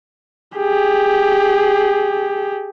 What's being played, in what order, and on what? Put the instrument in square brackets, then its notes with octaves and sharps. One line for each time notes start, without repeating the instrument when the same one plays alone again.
[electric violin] G4 G#4